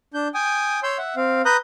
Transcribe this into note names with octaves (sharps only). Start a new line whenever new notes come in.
D4 G6
G5 G#5 D#6
C#5 C6 E6 G6
E5 F#5
C4 F5
B4 A#5 D#6 F#6 G6